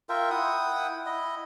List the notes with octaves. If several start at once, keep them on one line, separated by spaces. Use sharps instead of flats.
F4 A#4 E5 G5
E4 F#5 G5 D#6
E4 D#5